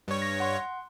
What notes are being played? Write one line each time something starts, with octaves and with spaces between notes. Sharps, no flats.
G2 C#5
A#6
F#5 C6